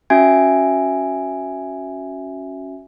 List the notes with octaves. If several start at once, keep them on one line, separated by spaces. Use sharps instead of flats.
C#4 F#4 E5 G#5 G#6